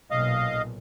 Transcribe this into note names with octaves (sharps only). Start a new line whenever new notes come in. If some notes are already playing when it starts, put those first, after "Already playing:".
B1 A#2 D#5 F5